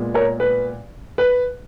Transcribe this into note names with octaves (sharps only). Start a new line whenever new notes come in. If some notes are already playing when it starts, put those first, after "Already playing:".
Already playing: A#2 G#3 B3
A#4 C#5
B4
B4